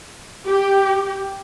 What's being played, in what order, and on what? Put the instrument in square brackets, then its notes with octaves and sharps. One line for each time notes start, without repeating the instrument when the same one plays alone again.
[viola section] G4